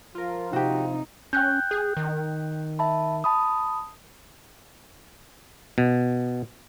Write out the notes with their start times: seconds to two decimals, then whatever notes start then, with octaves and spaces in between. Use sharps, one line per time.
0.15 F3 F4 A#4
0.53 C3 D#4 F#4 G4
1.33 C#4 G5 F#6 G6
1.71 G#4
1.97 D#3
2.79 E5 A5 B5
3.24 A5 B5 D#6
5.78 B2